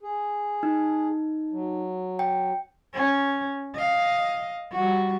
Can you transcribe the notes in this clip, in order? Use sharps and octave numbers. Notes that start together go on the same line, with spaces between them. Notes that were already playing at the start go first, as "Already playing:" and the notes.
G#4
D#4
F#3
G5
C#4
D#5 F5
G3 F#4